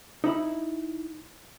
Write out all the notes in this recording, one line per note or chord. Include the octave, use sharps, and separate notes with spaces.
D#4 E4 B5